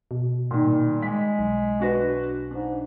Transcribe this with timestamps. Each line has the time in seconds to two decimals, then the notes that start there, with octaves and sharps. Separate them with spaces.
0.11 B2
0.51 A#2 D#3 G3
1.03 G#3 B6
1.39 B1
1.80 D4 F#4 B4
2.51 G#2 D4